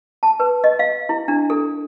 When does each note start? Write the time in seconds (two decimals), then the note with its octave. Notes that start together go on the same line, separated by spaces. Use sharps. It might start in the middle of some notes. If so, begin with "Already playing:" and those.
0.23 A5
0.40 B4
0.64 D#5
0.79 F5
1.09 E4
1.28 D4
1.50 A4